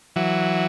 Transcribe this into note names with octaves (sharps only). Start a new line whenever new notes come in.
E3 F#3